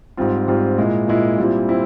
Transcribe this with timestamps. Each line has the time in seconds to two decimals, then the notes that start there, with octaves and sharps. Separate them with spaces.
0.17 G#2 G3 C4 F4
0.48 G#2 G3 C4 F4
0.78 A#2 G#3 E4
1.08 A#2 G#3 E4
1.38 A#2 G3 C4 E4
1.69 C4 E4